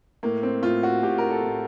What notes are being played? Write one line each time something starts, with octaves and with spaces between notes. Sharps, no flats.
A2 A#3
C4
A2 F4
F#4
A2 G4
A#4
A4
A2